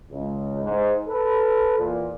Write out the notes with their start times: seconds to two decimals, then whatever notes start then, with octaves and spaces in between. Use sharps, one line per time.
0.10 C#2
0.64 G#2
1.07 A4 B4
1.77 E2 A#2